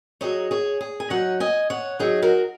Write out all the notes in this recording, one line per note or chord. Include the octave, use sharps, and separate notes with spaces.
F#3 D#4 G#4 C#5
G#4 C#5
G#4
G#5
F#3 D#4 C#5 F#5
D#5 G#5
C#5 F#5
F#3 D#4 G#4 C#5
F#4 A#4